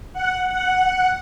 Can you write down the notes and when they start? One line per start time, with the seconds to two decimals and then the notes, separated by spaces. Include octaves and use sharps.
0.13 F#5
0.48 F#5